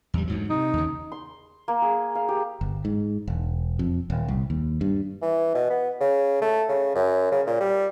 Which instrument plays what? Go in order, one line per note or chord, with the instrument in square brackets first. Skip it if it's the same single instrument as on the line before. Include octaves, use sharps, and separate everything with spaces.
[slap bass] E2 G3
D2 G#2 F#3
[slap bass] C3 [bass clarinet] D#4
[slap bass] D#2 C#3
[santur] C6
A#3
G#4
F5
G4
[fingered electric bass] G1
G#2
E1
F2
D#1
C2
D#2
G2
[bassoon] E3
B2
B3
C#3
A3
C#3
F#2
C#3
A#2
G3